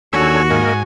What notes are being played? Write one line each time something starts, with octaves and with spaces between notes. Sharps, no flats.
D#2 D4 F#4 A4 C#5 G#5 E6
G#2 A#3 A#4 D#5 G#5